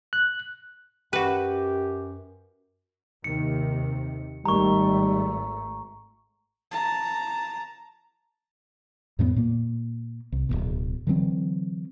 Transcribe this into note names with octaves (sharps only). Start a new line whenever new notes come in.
F#6
F#2 F#4 G4 B4
D#2 C3 D#3 C#7
G#1 D#3 G3 A3 A#5 C#6
A5 A#5
F2 A2 A#3 B3
A#2 A#3
C2
D1 G1 B2
D3 E3 F#3 C4